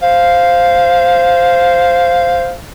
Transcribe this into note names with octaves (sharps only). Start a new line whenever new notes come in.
C5 F5